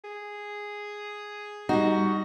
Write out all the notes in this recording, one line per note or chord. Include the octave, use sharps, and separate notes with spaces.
G#4
G3 D#4 F#4